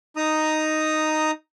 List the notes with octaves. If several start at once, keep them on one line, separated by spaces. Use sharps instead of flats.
D#4 A#5 D#6